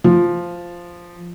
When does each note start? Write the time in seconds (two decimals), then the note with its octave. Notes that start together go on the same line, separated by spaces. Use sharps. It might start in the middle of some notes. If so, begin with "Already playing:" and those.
0.04 F3